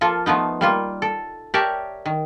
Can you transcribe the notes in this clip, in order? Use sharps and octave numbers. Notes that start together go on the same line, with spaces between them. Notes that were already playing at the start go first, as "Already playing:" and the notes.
F3 A#3 F4 A4
F3 A3 B3 D#4
G3 A#3 F4
A4
G4 A#4 C#5 D5 E5 A5
D#3